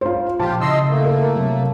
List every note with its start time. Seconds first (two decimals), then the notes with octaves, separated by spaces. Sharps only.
0.01 F4 C5
0.40 A#2 F3 F4 G4 A5
0.61 C#3 E4 D#5 C6 E6
0.89 A3 A#3
1.04 A#4
1.36 C3 F#3